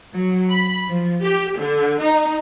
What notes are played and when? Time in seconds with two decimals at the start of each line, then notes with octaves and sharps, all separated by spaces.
0.13 F#3
0.50 B5
0.88 F3
1.22 G4
1.58 D3
2.02 D#4